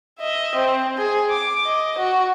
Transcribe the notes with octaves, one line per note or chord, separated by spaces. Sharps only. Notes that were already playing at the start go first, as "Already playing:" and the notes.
D#5 E5
C4
G#4
D6
D#5
F#4